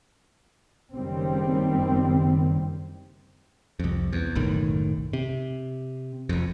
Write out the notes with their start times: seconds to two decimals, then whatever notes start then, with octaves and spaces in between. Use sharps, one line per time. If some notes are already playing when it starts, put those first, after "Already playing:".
0.96 F#1 D#3 G3 C4
3.79 C2 F2
4.13 E2
4.35 F#1 B1 A2 D#3
5.13 C3
6.29 F1 F2